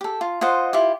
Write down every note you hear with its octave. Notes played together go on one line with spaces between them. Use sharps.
G4 A4
F4
F4 C5 D#5 F#5
E4 F4 G4